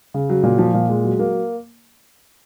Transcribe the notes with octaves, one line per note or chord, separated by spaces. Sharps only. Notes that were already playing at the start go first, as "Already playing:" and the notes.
C#3
F#3
A#2
F3
A#2
G#3
F#3
A#3